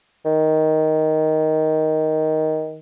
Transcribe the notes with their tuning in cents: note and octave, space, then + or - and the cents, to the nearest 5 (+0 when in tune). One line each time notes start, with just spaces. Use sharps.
D#3 +10